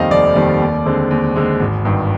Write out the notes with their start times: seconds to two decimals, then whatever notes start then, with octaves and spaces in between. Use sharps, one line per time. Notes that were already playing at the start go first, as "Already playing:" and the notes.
Already playing: F1 D#2 D#3 G3 C4 D#5 F5
0.10 F1 D5
0.35 D#2 D#3 G3 C4
0.61 D#2
0.86 D3 G#3 C4
1.11 D#2
1.35 D3 G#3 C4
1.60 G#1
1.85 G2 D#3